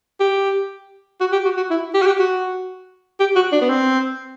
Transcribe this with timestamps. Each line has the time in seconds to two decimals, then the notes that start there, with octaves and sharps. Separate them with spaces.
0.20 G4
1.21 F#4
1.32 G4
1.45 F#4
1.57 F#4
1.70 E4
1.94 G4
2.02 F#4
2.07 G4
2.19 F#4
3.20 G4
3.36 F#4
3.52 D4
3.61 B3
3.69 C4